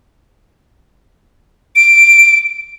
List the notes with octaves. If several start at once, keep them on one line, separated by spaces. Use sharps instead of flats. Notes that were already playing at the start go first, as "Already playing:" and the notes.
D7